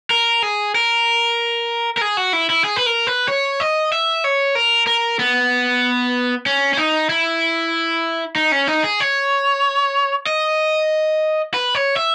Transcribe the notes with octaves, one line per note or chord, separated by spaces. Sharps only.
A#4
G#4
A#4
A#4
G#4
F#4
E4
E4
G#4
B4
A#4
B4
C#5
D#5
E5
C#5
A#4
A#4
B3
C#4
C#4
D#4
E4
D#4
C#4
D#4
G#4
C#5
D#5
B4
C#5
E5